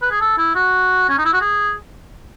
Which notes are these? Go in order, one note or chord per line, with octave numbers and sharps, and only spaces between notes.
B4
G#4
A4
E4
F#4
C#4
D#4
E4
F#4
G#4